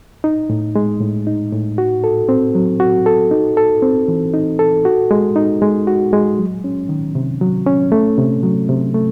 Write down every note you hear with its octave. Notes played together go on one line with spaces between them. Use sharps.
D#4
A2
G#3
A2
D#4
A2
F#4
A4
C4
F#3
F#4
A4
D#4
A4
C4
E3
D#4
A4
F#4
G#3
D#4
G#3
F#4
G#3
F#3
C#4
D#3
C3
F#3
C#4
A3
C3
F#3
C3
A3